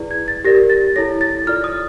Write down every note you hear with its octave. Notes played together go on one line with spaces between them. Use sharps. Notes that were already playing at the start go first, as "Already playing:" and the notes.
Already playing: E4 G#4 B4 D5
G#6
A6
G4 A#4 D5 A#6
A6
E4 A4 C#5 A#6
A6
F4 A4 D5 F6
D#6